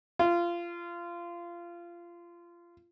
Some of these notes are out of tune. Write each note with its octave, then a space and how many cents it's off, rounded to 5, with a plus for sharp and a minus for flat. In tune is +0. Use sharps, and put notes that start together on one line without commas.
F4 -20